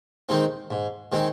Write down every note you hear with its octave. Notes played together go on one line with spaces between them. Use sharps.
D#3 G#3 C4 D#4
G#2
D#3 G#3 C4 D#4